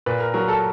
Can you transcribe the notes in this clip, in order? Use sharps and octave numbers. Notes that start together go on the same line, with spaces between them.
A#2 B4
A#4
F#3 A#4
A4